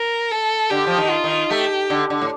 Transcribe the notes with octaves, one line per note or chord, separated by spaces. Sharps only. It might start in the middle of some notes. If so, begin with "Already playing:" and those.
Already playing: A#4
A4
D3 G4
F3
D#3
F4
D#3
A3 G4
D3
D3
A2